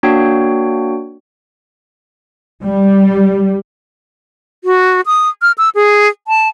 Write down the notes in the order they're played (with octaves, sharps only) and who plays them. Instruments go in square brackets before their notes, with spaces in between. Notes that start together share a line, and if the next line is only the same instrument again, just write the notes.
[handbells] A#3 D4 F#4 C#5 G5
[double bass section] G3
[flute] F#4
D#6
F6
E6
G#4
A5